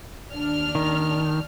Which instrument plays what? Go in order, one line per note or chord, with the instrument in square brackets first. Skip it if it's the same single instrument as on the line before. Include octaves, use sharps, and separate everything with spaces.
[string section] D#2 D4 F6
[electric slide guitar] D#3